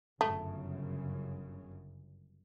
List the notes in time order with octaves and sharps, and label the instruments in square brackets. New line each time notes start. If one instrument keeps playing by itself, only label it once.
[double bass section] G1 F#2 C#3 [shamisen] A3